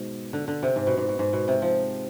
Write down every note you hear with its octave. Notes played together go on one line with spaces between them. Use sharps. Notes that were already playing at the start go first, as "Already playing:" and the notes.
Already playing: G#2 B2
D3
D3
C3
G#2
B2
G#2
B2
G#2
B2
C3
F3